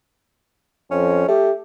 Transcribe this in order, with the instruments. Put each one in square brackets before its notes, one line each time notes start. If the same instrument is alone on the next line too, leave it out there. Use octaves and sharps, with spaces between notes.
[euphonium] F2 [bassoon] C#4
[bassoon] A3 [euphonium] G4